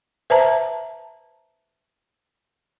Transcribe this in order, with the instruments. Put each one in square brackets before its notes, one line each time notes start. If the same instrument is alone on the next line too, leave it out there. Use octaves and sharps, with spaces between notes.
[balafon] B4 C5 E5 A5 A#5